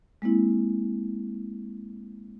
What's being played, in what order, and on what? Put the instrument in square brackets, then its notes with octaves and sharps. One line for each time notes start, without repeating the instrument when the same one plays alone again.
[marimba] G#3 A#3 C4 E4